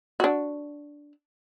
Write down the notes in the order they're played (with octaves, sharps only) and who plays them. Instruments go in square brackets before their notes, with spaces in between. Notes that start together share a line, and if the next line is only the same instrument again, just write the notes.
[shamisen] D4 F#4